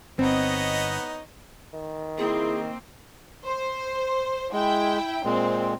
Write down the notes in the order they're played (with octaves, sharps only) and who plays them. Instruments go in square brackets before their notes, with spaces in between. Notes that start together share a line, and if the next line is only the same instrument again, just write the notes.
[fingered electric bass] G1 [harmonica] B3 D#4 [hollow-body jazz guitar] C4 [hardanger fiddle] C#5 D#5
[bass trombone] D#3
[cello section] A#3 C4 [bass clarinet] E4 [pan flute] G#4
[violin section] C5
[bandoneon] G#3 [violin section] E4 G5
[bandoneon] A#2 G#3 [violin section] C4